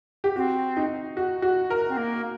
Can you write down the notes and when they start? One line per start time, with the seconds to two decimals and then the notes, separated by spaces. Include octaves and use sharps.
0.24 G4
0.36 C4 F#4
0.77 D#4
1.17 F#4
1.42 F#4
1.70 A#4
1.89 C4
1.97 A#3